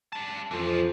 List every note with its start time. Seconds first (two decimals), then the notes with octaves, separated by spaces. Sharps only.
0.13 G3 A5
0.51 F2 E3 F3